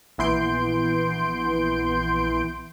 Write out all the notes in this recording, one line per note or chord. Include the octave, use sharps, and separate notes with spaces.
A#1 E3 B3 C6 G6 D7